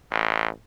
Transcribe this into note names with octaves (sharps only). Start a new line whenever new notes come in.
A1